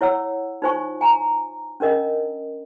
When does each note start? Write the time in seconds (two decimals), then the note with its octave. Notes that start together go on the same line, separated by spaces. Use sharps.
0.01 E4 C#5 F#5 E6
0.62 D#4 F4 C5 G#5 C#6
1.01 G#5 A#5
1.80 C#4 D4 A#4 D#5